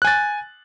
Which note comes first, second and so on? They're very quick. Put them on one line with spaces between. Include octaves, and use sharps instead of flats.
F#6 G#5 A6